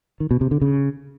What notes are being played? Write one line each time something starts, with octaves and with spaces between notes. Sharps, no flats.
D#3
B2
C3
D3
C#3